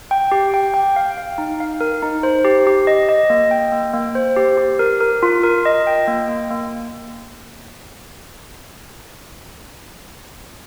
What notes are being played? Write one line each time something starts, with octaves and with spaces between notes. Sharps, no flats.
G5
G4
G5
G5
F5
F5
D#4
F5
A#4
D#4
C5
G4
G4
D#5
D#5
A#3
G5
A#3
A#3
C5
G4
G4
A#4
A#4
F4
A#4
D#5
G5
A#3
A#3
A#3